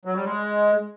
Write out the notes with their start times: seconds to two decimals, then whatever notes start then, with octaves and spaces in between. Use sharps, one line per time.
0.05 F#3
0.15 G3
0.25 G#3